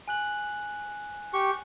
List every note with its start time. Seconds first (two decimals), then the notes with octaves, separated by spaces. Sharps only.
0.08 G#5 F#6 F#7
1.33 G4 C#6